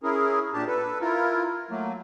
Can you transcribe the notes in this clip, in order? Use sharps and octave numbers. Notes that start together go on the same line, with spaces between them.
C#4 E4 G#4 A#4
A#2 D4 G4 A5
A4 B4
E4 F4 A#4
F#3 A3 A#3